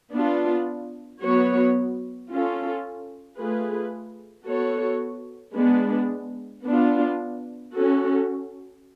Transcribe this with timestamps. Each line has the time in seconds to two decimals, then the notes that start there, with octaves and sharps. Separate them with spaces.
0.13 B3 D4 F4
1.21 F#3 B3 F#4 C#5
2.30 C#4 F4 A4
3.38 A3 F4 G#4 B4
4.47 B3 F#4 A4 C#5
5.55 G#3 B3 D4
6.64 B3 D4 F4
7.72 C#4 F#4 A4